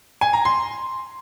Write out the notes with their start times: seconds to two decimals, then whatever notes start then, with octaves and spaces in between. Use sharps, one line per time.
0.21 G#5
0.33 A#5
0.45 C6